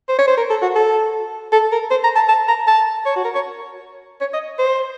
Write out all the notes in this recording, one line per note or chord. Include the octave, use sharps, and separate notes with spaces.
C5
C#5
C5
A#4
A4
F#4
A4
A4
A#4
C5
A#5
A5
A5
A#5
A5
C#5
F#4
A#4
C#5
C#5
D#5
C5